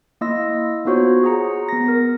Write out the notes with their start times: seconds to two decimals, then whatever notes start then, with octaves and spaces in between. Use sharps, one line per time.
0.21 A#3 E4 D#5 C6 E6 A#6
0.85 B3 D#4 F4 F#4 C5 C#5
1.23 G#4 F#5 A#5 C#7
1.69 B3 A#6
1.88 A#4